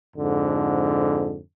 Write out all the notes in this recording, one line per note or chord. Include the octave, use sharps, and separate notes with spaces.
F2 G#2 D3